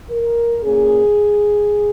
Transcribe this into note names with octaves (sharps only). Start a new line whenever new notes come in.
A#4
A#2 A#3 C#4 G#4